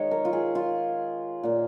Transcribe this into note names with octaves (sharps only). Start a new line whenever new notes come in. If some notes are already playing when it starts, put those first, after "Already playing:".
Already playing: D#3 G#3 C#5 D#5
A#4
F4
G#4
F4
A#2 A#3